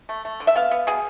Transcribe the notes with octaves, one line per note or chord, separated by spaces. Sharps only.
A3
A3
D3
E5
B3 F5
B3
B2 G#4